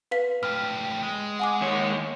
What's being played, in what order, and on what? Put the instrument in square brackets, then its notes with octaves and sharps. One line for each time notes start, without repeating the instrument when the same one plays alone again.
[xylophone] B4 F5 B6
[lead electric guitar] A2 G4 [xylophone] F6
[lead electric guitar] G#3
[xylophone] F#5 G#5 D6
[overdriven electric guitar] D#2 C#5